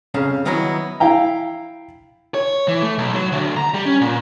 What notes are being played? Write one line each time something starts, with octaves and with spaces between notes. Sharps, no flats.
F2 C#3 F5 A#5
D#3 F#3 B3 D#4 E4 F#4
E4 F5 G5 A#5
C#5
E3
A3
B1
F#3
D2
A#5
G3
C#4
A#2